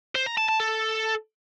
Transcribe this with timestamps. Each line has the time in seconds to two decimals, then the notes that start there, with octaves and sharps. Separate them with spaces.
0.15 C5
0.26 A#5
0.37 A5
0.49 A5
0.60 A4